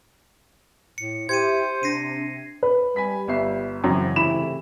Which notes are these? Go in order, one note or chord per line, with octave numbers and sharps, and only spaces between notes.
A2 C#7
E4 G4 C5 G#6 C#7 D#7
C3 D4 A#6 C7 D#7
B4
G3 G#5 B5 B6
G1 E5 C7
F#2 C#3 E3 C4
G#2 C3 A3 E4 B5 E7